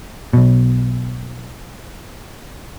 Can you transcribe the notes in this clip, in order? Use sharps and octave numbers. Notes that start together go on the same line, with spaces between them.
B1 B2